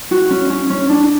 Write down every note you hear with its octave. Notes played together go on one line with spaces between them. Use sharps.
F#4
C#4
C#4
C#4
D4